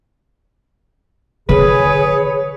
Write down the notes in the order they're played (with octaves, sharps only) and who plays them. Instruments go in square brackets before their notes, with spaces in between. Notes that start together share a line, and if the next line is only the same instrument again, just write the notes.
[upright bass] D3 D#3 [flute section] G#4 [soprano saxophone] B4 [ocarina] C#5